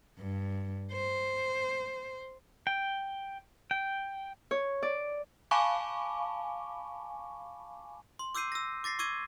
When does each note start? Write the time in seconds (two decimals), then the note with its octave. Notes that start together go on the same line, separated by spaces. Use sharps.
0.18 G2
0.92 C5
2.67 G5
3.71 G5
4.51 C#5
4.82 D5
5.51 F5 G#5 A5 B5 C#6 D6
8.19 C6
8.35 D6 E6 G6 C7 D#7
8.52 E6 A#6
8.84 D6 A6 A#6 C7
8.99 C#6 D6 E6 G#6 D#7